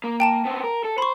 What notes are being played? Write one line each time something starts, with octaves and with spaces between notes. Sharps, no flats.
A#3
G5 A5 E7
B3 C4
A#4
A4
C5 B5 C#6